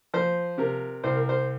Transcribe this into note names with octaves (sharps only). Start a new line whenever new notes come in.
F3 C5
C3 A#4
C2 C5
A#4
C5